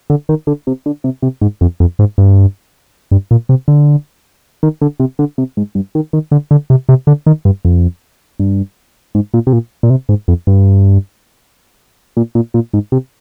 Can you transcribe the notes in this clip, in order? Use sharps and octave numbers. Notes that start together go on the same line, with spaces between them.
D3
D#3
D3
C3
D3
C3
C3
G#2
F2
F2
G#2
G2
G2
A#2
C3
D3
D#3
D3
C3
D3
C3
G#2
G2
D#3
D#3
D3
D3
C3
C3
D3
D#3
G2
F2
G2
G#2
A#2
C3
A#2
A#2
C3
G#2
F2
G2
A#2
A#2
A#2
G#2
C3